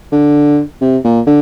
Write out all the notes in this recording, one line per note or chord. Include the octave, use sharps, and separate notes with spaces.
D3
C3
A#2
D3